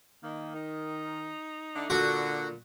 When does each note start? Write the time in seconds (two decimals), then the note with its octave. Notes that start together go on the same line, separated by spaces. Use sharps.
0.23 D#3 A#3
0.55 D#4
1.75 D3 A3 D4
1.90 A#2 D3 F#4